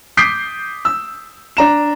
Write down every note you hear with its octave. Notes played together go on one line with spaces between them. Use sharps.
D6 D#6 G6 B6 C7 D7
E6
D4 A#5 E7